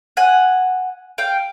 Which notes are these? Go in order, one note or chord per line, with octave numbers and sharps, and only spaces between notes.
F#5 G#5
F5 G5